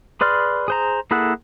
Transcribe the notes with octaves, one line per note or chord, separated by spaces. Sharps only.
G#4 B4 D5 C6 F6
G#4 C5 A#5
A#3 E4 G#4 A4 F#5